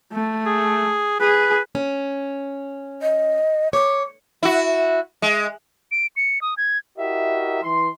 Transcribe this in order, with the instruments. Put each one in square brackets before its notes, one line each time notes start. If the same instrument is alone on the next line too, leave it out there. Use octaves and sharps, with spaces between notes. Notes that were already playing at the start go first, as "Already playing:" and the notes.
[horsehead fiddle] A3
[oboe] G#4
[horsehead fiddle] G#4 [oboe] B4
[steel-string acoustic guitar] C#4
[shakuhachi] D#5
[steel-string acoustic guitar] C#5 [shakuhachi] D6
[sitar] E4 F#4
G#3
[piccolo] D7
C#7
D#6
G#6
[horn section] E4 F#4 G4 A#4 D#5 E5
E3 C6